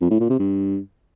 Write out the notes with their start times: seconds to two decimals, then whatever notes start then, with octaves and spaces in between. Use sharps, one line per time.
0.01 F2
0.10 A2
0.20 A#2
0.30 C3
0.39 G2